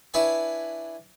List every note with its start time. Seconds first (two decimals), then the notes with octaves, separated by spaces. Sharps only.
0.14 D4 E4 B4 C#5 G#5 C#6